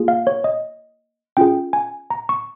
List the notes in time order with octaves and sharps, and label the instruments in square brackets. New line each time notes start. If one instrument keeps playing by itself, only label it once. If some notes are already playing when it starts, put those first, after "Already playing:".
Already playing: [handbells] A#3 F4 G#4
F5
C#5
D#5
C#4 F4 G#4 G5
G#5
A#5
C#6